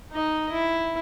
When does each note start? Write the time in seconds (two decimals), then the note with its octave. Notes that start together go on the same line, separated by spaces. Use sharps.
0.12 D#4 D#5
0.52 E4